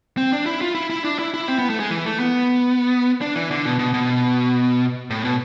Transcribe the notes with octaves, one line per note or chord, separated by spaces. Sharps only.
C4
D4
E4
F4
E4
E4
D4
E4
E4
C4
B3
A3
G#3
E3
A3
B3
D4
E3
D3
B2
B2
B2
A2
B2